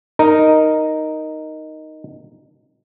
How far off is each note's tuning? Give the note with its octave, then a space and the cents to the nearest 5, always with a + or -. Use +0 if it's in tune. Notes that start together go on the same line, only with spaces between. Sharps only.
D#4 +0 A#4 -5